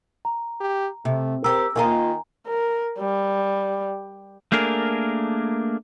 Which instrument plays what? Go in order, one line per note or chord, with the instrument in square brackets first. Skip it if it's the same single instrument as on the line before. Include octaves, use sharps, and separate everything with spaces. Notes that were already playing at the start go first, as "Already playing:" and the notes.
[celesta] A#5
[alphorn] G4
[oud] C3 [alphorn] A3
[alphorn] C4 [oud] G4 A#4 [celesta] E6
[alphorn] D#3 [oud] A#3 F4 D#5 [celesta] G#5 A#5
[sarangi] A#4
G3
[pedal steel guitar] A3 A#3 D4 G#4 A#4